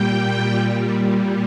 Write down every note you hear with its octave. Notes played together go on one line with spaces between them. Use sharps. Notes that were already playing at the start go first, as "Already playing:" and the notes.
Already playing: A#2 G3 G5